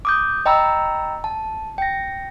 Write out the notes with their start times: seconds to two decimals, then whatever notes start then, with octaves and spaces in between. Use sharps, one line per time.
0.05 D6 D#6 G6
0.46 D#5 G5 A#5 B5 E6
1.24 A5
1.78 G5 A#6